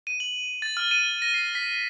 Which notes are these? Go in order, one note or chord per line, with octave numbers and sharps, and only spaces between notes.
D#7
F#7
A6
F6
D#7
A#6
C7
B6